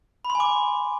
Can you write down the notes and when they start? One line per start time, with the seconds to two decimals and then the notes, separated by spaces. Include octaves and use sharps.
0.25 B5
0.30 C6
0.35 G#5
0.40 D6
0.45 G#5